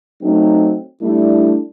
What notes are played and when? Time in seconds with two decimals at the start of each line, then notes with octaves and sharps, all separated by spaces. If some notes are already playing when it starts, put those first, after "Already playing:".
0.22 F#3 A3 C4 D#4
1.02 G3 A3 D4 E4